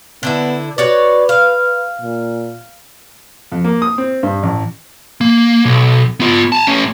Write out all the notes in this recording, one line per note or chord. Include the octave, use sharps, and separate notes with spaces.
D3 B3 D4 E4
F#4 B4 C#5 D5
F5
A#2
F2
A#3
D#6
C4
G2
A1
A#3
B1
B3 F4
G#5 A5
A3 C#4